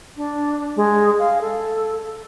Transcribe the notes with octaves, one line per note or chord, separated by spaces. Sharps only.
D4
G#3
F5
A4